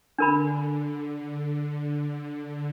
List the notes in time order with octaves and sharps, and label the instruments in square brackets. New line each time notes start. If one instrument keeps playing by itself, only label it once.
[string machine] D3 [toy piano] D4 A#4 B5